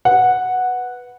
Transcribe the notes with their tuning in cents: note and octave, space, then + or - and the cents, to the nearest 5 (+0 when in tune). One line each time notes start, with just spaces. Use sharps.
B4 +0 F#5 -5